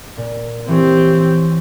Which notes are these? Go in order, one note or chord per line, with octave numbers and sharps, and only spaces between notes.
A#2
E3 C4 G4 C#5